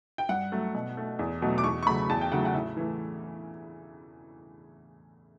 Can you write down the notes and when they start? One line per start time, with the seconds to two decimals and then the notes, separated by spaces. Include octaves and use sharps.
0.18 G5
0.29 G2 F#5
0.52 F#3 A3
0.74 B2
0.97 A3
1.19 E2
1.42 B2 F#3 A3
1.58 D6
1.64 E2 C#6
1.83 C#6
1.86 C#3 F#3 A3 B5
2.09 E2 A5
2.21 G5
2.32 C#3 F#3 A3 F#5
2.45 F#5
2.54 A2 E5
2.77 E3 A3